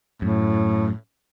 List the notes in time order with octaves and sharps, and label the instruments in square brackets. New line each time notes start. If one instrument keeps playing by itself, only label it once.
[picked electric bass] F#2 [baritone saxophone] A2